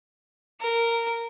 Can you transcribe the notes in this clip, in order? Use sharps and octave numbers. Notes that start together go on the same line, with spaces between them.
A#4